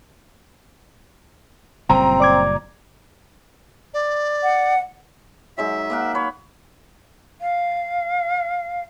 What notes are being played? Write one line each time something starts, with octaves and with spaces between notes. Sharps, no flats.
F#1 A#2 G3 C4 A#5
D5 D6 G#6
D5
F#5
F#3 G#3 D#4 E5
A#3 A#4 F#5
C#5 B5
F5